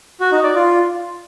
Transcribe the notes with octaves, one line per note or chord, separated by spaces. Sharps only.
F#4
D#4
D5
F4